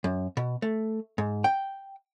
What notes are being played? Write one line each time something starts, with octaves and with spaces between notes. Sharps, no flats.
F#2
B2
A3
G#2
G5